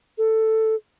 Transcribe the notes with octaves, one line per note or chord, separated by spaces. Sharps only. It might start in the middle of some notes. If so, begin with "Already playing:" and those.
A4